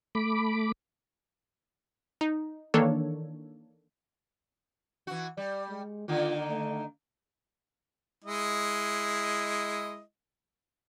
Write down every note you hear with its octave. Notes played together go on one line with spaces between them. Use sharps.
A3 B5 D6
D#4
D#3 E3 A#3 D4 A4 C#5
E3 F#4
G3 D5
G#3
D3 D#3 A#3 F4
A3
G#3 E4 D#5